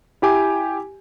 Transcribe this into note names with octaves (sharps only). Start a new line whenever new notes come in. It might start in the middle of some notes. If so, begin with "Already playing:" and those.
E4 G4 G#5 D6